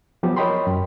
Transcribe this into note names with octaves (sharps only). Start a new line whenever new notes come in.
F3 F#3 B3 G4
A#4 C#5 D#5 G5 B5 C6
F#2